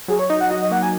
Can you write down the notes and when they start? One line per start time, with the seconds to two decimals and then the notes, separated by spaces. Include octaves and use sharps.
0.08 F#3 G#4
0.19 C#5
0.30 D#4 D#5
0.41 F#5
0.50 F#4 D#5
0.62 D#5
0.71 A#3 F#5
0.83 G#5